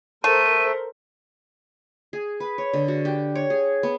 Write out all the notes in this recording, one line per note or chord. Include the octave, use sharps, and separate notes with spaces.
A3 A4 A#4 C5 D#7
G#4
B4
C#5
D3
F#4
G4
C#5
G#4
B3